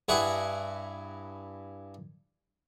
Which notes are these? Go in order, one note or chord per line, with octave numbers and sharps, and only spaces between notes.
G2 E4 G#4 F#5